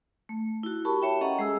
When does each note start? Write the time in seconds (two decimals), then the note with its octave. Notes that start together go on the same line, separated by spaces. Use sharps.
0.29 A3
0.63 E4 F#4
0.85 G4 A#4 A5 B5 C#6
1.02 C#5 E5 G5
1.21 C#4 A4 D#5 F#5 A#5 C#6
1.39 G#3 G#4 E6